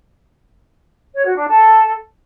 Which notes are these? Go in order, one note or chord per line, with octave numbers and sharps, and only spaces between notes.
C#5
F#4
D4
A4